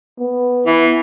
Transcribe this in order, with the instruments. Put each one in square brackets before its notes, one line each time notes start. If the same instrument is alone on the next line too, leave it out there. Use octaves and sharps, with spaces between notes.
[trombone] B3
[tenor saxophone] E3